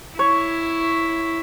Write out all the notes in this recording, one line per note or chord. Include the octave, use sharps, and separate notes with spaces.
E4 C#5